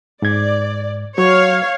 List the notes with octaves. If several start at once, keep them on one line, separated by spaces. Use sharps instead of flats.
G#2 D5 G#6
F#3 C#5 F5